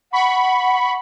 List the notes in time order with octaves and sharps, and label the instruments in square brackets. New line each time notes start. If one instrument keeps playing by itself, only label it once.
[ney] F#5 [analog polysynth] B5 C#6